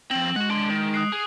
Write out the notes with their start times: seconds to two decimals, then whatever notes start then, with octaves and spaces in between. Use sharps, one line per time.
0.11 F3 C4 G5 F#7
0.36 G#3 F#4 F#5
0.50 D4 C6 D7
0.70 D#3
0.94 D#6 F#6 C7
1.12 G#4